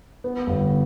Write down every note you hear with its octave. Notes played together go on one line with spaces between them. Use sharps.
B3
G1